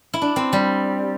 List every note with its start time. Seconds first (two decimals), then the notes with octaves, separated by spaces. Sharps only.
0.14 E4
0.22 D4
0.36 C4
0.53 G3